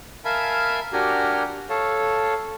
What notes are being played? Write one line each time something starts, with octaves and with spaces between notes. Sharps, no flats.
A#4 E5 F5 G#5 A5 B5
D4 F#4 G4 A#4 G#5 A#5
A4 C#5 F5 A5